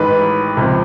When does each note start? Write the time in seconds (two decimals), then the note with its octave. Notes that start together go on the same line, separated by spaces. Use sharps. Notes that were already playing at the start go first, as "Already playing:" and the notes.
Already playing: A1 G#2 D#3 B4
0.57 C#2 C3 F3